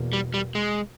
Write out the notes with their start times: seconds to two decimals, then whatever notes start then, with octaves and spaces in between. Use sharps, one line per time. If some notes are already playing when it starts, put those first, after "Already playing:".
Already playing: E2 B2 A#3
0.13 G3
0.34 G3
0.55 G#3